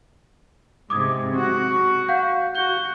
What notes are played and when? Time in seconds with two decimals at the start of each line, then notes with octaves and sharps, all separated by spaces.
0.90 G#2 C3 D6 D#6 G#6
1.35 F#4
2.08 F5 F#5 G6
2.55 F#4 G6 G7